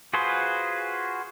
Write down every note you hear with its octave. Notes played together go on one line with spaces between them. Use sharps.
F4 F#4 G#4 B4 C5